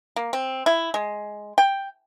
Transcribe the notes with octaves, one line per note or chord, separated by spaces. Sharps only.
A#3
C4
E4
G#3
G5